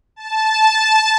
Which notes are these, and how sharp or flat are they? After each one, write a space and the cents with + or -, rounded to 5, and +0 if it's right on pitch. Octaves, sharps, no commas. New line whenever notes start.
A5 -10